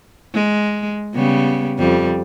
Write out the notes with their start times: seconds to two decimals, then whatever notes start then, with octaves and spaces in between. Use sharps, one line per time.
0.34 G#3
1.14 C#3 G3 B3
1.79 F2 G3